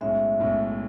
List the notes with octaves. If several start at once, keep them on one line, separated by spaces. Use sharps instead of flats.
B1 A2 G#3 C#4 E5
B1 A2 G#3 C#4